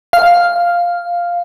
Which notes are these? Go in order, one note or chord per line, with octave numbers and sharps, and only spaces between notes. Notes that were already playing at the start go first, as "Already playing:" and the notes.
F5